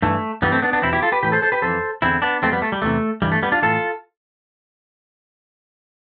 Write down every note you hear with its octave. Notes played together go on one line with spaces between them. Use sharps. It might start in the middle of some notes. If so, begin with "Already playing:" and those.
G2 E3 A3
G2 E3 G3 B3
A3 C4
B3 D4
B3 D4
E2 B2 C4 E4
E4 G4
F4 A4
G4 B4
A2 E3 G4 B4
A4 C5
A4 C5
G4 B4
F2 E3 A4 C5
E2 D3 C4 E4
B3 D4
F2 E3 A3 C4
G3 B3
A3
G3
E2 C3 E3 A3
G2 E3 G3
A3
G3 B3
D4 F4
A2 E3 F4 A4